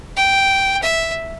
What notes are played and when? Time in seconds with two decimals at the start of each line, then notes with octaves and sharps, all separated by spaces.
0.16 G5
0.83 E5